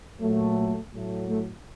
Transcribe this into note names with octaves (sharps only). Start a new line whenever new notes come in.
A#2 F#3 A3
A2 F#3 A3
A3